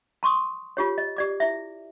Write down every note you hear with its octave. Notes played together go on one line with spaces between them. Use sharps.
A5 C6 C#6 D#6
F4 G4 C#5
D#5
G4 D5 D6
E4 E5